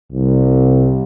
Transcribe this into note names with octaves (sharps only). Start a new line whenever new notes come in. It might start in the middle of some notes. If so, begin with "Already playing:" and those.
C2